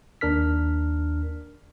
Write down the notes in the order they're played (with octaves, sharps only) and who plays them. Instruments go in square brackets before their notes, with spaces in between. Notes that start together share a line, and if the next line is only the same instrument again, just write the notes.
[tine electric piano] D#2 D4 A#4 F6 B6